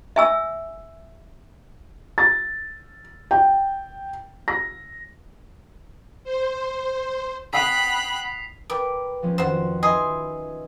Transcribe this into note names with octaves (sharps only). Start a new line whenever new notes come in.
E5 G#5 E6
A6
G5
A#6
C5
F#5 G5 B5 D#6 F#6 B6 C7 F7
A#4 B4 G5 D6
F3 G#3 C#4
F2 D#3 F#4 C5 F#5
D#4 B4 D#5 E5 G#5 C6